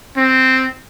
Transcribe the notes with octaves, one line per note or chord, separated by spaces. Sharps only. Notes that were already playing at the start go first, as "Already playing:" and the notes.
C4